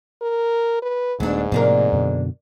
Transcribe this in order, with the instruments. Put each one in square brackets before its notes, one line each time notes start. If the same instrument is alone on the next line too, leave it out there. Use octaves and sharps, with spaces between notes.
[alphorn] A#4
B4
[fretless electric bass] D#1 A3 B3 [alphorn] G#2 [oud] F#3 D4
[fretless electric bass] A2 C3 F3 [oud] A#3 D4 A#4
[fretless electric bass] F#2 B2 D3